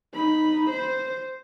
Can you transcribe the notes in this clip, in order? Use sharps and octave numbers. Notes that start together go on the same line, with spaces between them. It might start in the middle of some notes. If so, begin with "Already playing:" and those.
D#4 B5
C5